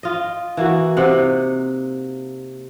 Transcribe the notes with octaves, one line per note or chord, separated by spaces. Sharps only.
F4 D#5
E3 A#3 F#4
C3 D#4 F#5